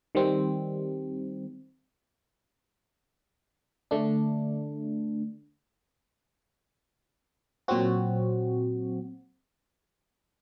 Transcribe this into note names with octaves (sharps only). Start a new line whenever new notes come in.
D#3 G3 C4
D3 A3 D4
A#2 F#3 C4 F#4